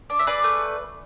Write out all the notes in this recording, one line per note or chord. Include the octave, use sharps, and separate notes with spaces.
D4
E5
G#4 B4 D5
A3